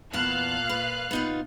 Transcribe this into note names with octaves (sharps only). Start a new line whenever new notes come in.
E2 A#2 B3 F5 A5 F#6
B4
B3 D#4 F4